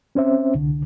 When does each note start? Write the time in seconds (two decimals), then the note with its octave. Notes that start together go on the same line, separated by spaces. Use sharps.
0.15 C4 C#4 C5 E5
0.54 C2 D3